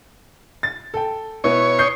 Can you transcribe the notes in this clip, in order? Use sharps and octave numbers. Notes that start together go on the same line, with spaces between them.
A6
A4 G5
B2 B3 E4 C#5
D#6 G6 C7